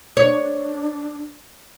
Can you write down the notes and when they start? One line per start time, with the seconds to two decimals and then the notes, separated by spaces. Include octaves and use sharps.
0.17 D4 C#5